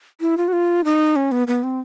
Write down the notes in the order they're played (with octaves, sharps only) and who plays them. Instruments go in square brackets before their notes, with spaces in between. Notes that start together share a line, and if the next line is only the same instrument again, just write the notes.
[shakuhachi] E4
F4
F#4
F4
D#4
C#4
B3
B3
C4